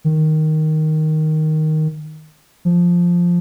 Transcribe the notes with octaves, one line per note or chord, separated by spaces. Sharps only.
D#3
F3